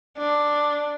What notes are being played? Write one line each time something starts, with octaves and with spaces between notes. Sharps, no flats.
D4